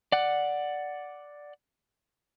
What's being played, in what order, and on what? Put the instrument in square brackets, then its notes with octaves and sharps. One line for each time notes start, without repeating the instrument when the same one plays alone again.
[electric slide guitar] D5 F#5